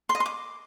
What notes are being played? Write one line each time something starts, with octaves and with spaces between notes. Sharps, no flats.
C6
D#5
C6
D6